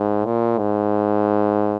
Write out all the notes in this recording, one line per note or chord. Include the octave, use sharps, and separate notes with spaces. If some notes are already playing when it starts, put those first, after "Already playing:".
Already playing: G#2
A#2
G#2